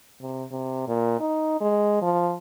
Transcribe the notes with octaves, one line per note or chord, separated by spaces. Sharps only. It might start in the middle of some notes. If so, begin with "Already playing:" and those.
C3
C3
A#2
D#4
G#3
F3